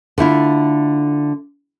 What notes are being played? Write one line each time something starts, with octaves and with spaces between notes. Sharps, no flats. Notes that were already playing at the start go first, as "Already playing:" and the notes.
D3 A3 E4 F4